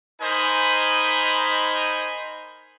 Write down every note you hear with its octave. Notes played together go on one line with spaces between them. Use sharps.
D#4 A#4 C5 D#5 G#5 B5